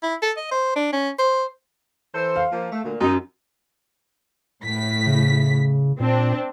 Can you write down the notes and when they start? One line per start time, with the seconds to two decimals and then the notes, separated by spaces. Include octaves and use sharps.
0.03 E4
0.22 A4
0.37 D#5
0.51 C5
0.76 D4
0.92 C#4
1.19 C5
2.15 E3 A4 C5
2.36 F5
2.52 F3 A#3
2.72 A3
2.84 D2 A#2
3.01 F#2 D#4
4.64 A2 B6
5.06 C#3
6.00 A#2 C4 D4